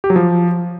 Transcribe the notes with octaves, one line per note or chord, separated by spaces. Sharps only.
G4
F#3
F3